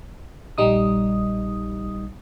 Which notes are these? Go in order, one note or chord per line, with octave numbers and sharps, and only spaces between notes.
A#1 G3 D#4 D#6